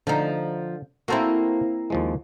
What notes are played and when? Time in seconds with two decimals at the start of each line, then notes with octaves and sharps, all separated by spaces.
0.07 D3 F3 D#4
1.08 A#3 C4 E4 F#4 A4 C5
1.90 D#2 F3 G#3